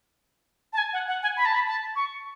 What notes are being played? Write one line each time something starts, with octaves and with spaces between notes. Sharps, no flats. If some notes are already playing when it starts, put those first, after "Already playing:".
A5
G#5
F#5
F#5
G#5
B5
A5
B5
A5
C#6